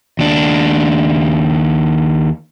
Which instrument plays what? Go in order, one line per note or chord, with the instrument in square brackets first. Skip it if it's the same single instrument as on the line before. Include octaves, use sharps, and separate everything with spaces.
[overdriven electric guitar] D#2 D4